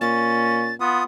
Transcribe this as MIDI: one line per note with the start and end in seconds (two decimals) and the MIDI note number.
0.01 0.76 46
0.01 0.72 61
0.01 0.74 93
0.80 1.02 59
0.80 1.04 65
0.80 1.04 87